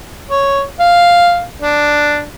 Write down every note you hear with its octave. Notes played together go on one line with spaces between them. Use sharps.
C#5
F5
D4